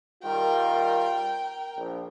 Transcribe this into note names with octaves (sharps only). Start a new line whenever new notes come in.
D#3 G3 F4 A#4 G5
A#1